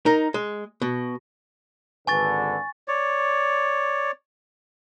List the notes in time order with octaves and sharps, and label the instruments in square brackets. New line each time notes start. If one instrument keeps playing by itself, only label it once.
[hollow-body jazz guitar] D#4 A#4
G#3
B2
[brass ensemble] G#1 D3 B4 [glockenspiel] G#5 C#6 A6
[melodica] C#5 D5